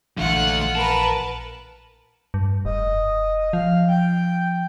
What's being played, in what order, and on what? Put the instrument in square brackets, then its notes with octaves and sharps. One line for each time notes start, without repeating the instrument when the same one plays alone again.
[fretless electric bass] A#1 E3 [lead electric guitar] D3 A3 [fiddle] F4 F#5
[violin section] A#4 B4 [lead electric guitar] A5
[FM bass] G2
[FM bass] F1 [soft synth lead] D#5
[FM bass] F3 [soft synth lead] F5
[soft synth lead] G5